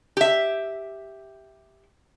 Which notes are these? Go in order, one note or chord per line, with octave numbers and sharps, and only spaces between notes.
G4 E5